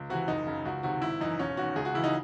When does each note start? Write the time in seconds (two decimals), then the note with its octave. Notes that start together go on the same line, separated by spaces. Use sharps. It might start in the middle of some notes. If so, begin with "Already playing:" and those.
Already playing: C#2
0.09 C3 E3 F#4
0.28 F#1 D#4
0.46 F#2 C#3
0.65 C#2 F#4
0.83 C3 D#3 F#4
1.02 G#1 E4
1.21 F#2 E3 D#4
1.39 E1 C#4
1.57 E2 D#3 F#4
1.76 C#2 G#4
1.85 F#4
1.94 C#3 E3 E4
2.04 D#4